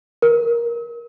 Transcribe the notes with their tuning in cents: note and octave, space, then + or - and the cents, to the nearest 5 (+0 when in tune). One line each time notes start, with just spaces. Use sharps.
A#4 +15